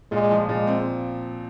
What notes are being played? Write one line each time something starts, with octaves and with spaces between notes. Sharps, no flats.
A#2 G#3
F3
A#2 G#3
C4